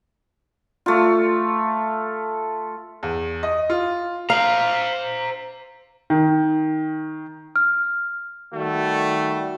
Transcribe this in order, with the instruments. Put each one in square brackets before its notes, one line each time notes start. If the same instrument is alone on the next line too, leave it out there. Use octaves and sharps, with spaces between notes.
[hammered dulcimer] A3 F4
[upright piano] E2
D#5
F4
[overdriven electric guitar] C5 A#5 [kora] F5
[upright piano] D#3
[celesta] F6
[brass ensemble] D#3 G3 F#4 [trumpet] A3